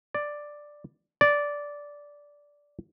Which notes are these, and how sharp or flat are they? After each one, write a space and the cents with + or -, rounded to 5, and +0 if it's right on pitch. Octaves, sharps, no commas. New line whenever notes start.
D5 +5
D5 -10